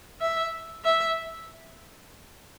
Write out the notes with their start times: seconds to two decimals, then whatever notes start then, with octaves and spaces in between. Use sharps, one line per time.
0.21 E5
0.85 E5